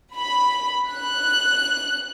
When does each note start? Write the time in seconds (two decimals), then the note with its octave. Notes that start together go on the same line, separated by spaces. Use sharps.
0.14 B5
0.90 F#6